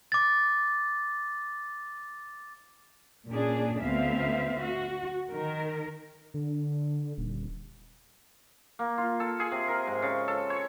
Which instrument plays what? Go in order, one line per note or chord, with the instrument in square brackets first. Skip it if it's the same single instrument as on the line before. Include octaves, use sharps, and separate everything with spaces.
[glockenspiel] D6 A6
[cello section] A#2 C#4 D4 G#4
D2 B3 C4 E5 F5
F#4
D#3 A#4
[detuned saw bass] D3
D#1
[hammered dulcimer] A#3
F4
A4
G#4
C3
A#4
G#2
C#3
A4
C#5